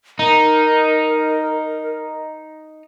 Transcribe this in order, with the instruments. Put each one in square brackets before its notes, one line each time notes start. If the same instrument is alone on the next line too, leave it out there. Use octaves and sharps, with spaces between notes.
[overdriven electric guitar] D#4 [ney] A#4